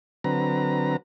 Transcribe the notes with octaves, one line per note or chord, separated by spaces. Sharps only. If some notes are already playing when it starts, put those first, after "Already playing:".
D3 F#3 C4 B4 A#5